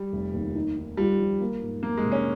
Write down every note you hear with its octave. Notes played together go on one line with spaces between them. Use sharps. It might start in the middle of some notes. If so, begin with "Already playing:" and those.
Already playing: G3
F1
D#2
D#4
D#3
G3 F4
F3
A#3
G#2
F2 A#3
G#3
C3
C#4